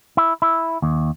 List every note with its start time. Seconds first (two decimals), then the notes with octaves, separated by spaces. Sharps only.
0.17 E4
0.42 E4
0.82 D#2